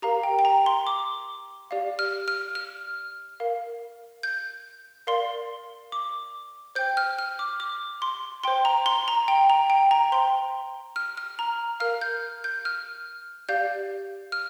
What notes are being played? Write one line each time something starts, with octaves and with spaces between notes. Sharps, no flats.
G4 A#4 F5 A#5
G5
G5
A#5
C6
D6
G4 D5 F5
F6
F6
F6
A#4 F5
G6
A#4 D5 F5 C6
D6
C5 G5 G6
F6
F6
D6
D6
C6
C5 G5 C6
A#5
C6
A#5
G5
A#5
G5
A#5
C5 G5 C6
F6
F6
A#5
A#4 F5 F6
G6
G6
F6
G4 D5 F5 G6
F6